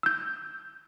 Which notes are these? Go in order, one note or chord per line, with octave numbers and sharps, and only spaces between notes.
E6 G6